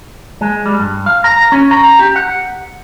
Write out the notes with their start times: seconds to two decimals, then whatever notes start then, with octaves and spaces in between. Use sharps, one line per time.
0.41 G#3
0.66 G3
0.80 G2
1.06 F5
1.24 A#5
1.52 C#4
1.71 A#5
1.99 G4
2.16 F#5